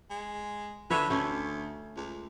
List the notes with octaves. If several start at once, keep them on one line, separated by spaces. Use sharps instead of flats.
G#3
D3 B4 C#5 E5
D2 A3 C#4
C#2